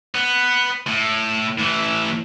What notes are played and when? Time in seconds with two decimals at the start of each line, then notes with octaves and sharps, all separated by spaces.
0.15 B3
0.87 A2
1.58 A2 E3